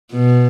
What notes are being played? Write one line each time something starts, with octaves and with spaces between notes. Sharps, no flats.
B2